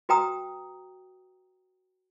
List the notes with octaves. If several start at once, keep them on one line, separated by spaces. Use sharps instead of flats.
F#4 B4 G5 A#5 D#6